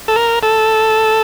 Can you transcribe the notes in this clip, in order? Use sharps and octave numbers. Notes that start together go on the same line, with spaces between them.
A4
A#4
A4